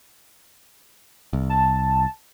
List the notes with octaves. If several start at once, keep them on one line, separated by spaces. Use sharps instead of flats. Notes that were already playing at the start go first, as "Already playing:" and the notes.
C2
A5